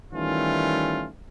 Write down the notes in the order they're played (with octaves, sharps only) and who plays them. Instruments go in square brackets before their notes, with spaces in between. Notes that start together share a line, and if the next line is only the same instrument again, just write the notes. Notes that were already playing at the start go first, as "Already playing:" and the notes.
[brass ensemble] D#3 E3 G3 A3 C#4 F4